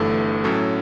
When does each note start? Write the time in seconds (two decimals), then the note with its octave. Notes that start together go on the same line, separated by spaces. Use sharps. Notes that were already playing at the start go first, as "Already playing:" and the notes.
Already playing: G1 G2 E3 A3 A4
0.44 A2 F#3 C#4 A4